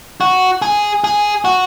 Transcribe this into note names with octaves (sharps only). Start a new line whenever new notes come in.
F#4
G#4
G#4
F#4